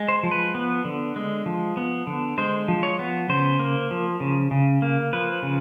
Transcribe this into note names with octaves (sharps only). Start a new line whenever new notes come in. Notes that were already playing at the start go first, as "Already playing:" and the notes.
Already playing: G#3
C5
F3
B4
B3
D3
G#3
F3
B3
D3
G#3 C5
F3
C#5
B3
C#3 C5
A#3
F3
C#3
C#3
A#3
F3 B4
C#3